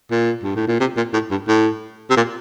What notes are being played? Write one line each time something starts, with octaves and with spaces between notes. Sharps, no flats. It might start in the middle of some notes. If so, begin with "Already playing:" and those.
A#2
G2
A2
A#2
C3
A#2
A2
G2
A2
C3
A#2